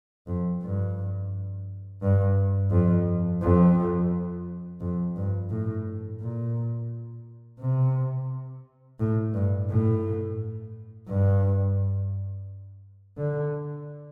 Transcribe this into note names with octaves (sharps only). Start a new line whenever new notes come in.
F2
G2
G2
F2
F2
F2
G2
A2
A#2
C3
A2
G2
A2
G2
D3